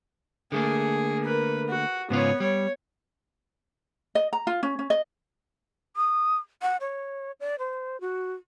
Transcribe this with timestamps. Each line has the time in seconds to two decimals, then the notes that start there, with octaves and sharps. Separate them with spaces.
0.52 D3 A3 A#3 G#4
1.24 A#4 B4
1.68 F#4
2.10 G#2 C#3 B3 F4 C#5
2.40 G3 C#5
4.15 D#5
4.33 A#5
4.47 F4
4.63 C#4
4.79 C#4
4.90 D#5
5.96 D#6
6.62 F#5
6.81 C#5
7.40 D5
7.59 C5
8.01 F#4